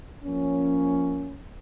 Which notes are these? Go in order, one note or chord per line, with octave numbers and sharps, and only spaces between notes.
F3 A#3 C#4